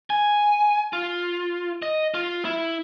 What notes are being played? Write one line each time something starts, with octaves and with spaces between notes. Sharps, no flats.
G#5
F4
D#5
F4
E4